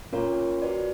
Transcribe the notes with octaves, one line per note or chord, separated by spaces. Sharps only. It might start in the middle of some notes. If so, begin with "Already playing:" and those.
A#2 A#3 C#4 F4 A#4 C#5
F#4 B4 D5